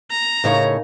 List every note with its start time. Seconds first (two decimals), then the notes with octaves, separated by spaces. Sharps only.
0.11 A#5
0.44 A2 C#3 A#3 D#4 C#5